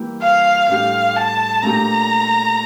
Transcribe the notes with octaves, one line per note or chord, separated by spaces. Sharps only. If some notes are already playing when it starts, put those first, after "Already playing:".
Already playing: E3 G3 A#3 E4 G4
F5
A2 G3 D4 G4 F5
A5
A#2 A3 D4 G4 A#5